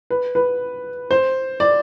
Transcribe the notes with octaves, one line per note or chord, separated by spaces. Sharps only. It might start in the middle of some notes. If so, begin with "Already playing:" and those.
B4
B4
C5
D5